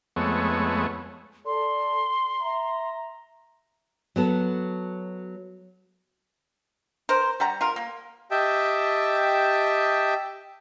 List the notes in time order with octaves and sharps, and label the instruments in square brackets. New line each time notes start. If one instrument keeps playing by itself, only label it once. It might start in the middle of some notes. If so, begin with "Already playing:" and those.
[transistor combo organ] F2 G#3 A3 B3 C#5
[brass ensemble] A4 D5 [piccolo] C6
[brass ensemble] E5 A#5
[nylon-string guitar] F#3 B3 A4
[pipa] A#4 C5
G3 F#5 A#5
F4 A#4
A#3
[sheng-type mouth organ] G4 D#5 E5 G5 A5